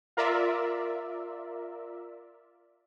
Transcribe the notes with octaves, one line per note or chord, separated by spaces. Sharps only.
F4 A#4 D5 E5